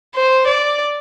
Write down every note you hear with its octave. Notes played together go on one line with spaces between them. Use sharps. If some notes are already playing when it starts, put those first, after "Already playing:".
C5
D5